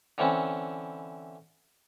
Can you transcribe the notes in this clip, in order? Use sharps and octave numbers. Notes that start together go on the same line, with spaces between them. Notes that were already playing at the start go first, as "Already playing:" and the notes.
D3 E3 C4 C#4